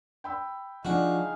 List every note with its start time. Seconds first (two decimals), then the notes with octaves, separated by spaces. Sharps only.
0.24 G5 B5 E6
0.85 F3 D4 D#4 F#4 G#4 F5